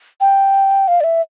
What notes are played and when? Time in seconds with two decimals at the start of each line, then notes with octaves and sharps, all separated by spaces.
0.20 G5
0.88 F5
1.00 D5
1.04 E5